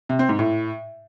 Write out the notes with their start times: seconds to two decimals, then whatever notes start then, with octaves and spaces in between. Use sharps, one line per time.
0.09 C3
0.19 C4
0.29 G#2
0.39 A2